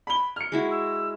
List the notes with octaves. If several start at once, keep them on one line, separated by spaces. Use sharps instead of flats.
B5 G7
F6 C#7
G#3 E4 F#4
E6